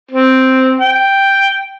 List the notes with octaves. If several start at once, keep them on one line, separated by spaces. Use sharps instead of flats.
C4
G5